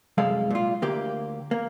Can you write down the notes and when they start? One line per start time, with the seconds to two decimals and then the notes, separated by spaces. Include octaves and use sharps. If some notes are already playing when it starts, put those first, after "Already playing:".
0.18 C2 F#2 G#3 A4 F5
0.51 A#2 F4
0.82 D2 A#3 G4
1.51 A#3